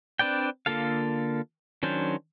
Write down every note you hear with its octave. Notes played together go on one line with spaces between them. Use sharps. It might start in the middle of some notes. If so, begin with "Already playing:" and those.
C4 D4 B4 D5 G5
D3 A#3 F4 A4 F5
D#3 F#3 C#4 D4 C5